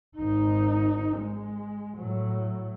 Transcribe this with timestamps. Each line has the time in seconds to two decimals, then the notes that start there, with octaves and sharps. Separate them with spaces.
0.17 G#1 D#4
1.18 G#3
1.97 A2 F#3